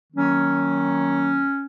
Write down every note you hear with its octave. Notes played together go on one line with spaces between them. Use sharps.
D#3 F#3 A#3 C#4